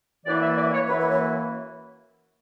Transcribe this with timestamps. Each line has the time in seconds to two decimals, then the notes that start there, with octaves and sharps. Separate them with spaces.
0.25 F#2 E3 A#3 E4 D5
0.41 E5
0.56 D5
0.73 C#5
0.88 F#2 E3 A#3 E4 B4
0.99 B4
1.09 C#5